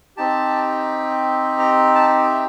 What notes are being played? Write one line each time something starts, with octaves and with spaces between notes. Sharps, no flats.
C4 D#4 G4 A5
A#5
A5
E5